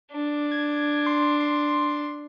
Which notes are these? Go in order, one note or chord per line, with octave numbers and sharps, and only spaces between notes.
D4
G#6
C6
C6